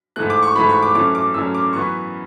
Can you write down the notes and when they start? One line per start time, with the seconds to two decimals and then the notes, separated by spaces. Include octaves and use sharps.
0.16 G#2 E3 A3 F#6
0.30 D6
0.42 C#6
0.56 G#2 E3 A3 B5
0.69 C#6
0.83 D6
0.95 F#2 E3 A3 C#4 D6
1.15 D6
1.34 F#2 E3 A3 C#4 E6
1.55 D6
1.73 F#2 E3 B3 C#6